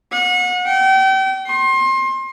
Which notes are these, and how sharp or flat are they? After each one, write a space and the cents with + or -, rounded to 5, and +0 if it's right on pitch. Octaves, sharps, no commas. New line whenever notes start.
F#5 -35
G5 -35
C6 +30